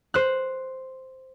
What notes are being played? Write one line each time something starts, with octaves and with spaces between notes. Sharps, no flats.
C5 F#6